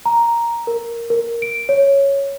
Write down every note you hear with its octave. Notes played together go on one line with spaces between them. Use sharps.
A#5
A#4
A#4
D7
C#5